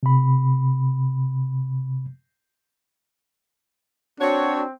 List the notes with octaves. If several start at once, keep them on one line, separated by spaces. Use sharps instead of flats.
C3 B5
C4 D4 F#4 C#5